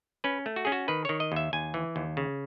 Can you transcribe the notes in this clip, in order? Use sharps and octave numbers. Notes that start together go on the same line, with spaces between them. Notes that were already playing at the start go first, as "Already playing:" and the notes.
C#4 B4
A3
F#4
C#4 G#4
F#4
D#3 B4
D#3 C#5
D#5
D#2 E5
D#2 G#5
E3
D#2
C#3